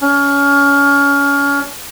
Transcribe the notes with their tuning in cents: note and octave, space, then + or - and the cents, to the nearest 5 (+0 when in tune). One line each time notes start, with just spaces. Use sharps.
C#4 +25